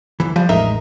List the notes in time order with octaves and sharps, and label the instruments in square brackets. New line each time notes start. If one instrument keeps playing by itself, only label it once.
[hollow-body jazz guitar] D2 E3
[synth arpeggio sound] F3 [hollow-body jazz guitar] G3
[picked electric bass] A1 E2 A2 [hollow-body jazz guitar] G#3 D#4 A#4 [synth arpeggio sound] E5